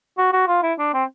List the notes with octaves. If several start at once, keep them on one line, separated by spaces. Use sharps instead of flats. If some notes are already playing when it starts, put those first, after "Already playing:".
F#4
F#4
F4
E4
D4
C4